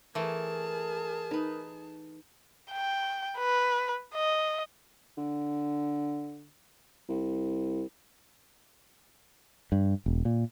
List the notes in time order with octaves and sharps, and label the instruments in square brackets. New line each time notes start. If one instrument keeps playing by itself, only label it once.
[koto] E3 A3 [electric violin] G#4 A5 [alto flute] A#4
[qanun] D#4 B4
[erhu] G5
B4
D#5
[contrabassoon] D3
C2
[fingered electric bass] G2
E1
A#2